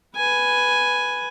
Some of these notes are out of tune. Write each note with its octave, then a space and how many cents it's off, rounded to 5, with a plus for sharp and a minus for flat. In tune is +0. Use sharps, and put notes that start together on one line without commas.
B4 +0 G#5 +0